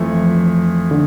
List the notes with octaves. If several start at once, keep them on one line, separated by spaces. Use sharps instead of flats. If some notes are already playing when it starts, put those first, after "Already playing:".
Already playing: F2 E3 F3 A3
D3